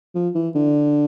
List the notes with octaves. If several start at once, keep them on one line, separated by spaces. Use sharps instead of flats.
F3
E3
D3